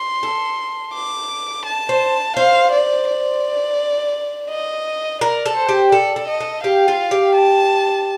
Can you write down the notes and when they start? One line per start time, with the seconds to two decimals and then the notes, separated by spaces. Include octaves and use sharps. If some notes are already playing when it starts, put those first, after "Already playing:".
Already playing: C6
0.23 A4
0.94 D6
1.66 A5
1.89 C5
2.37 C5 F5
2.72 D5
3.08 D5
4.50 D#5
5.21 A#4 D5
5.46 A4
5.57 C5
5.69 G4
5.92 A4 D5
6.16 A4
6.28 D#5
6.40 A4
6.63 G4 F5
6.88 F4
7.11 G4
7.35 A5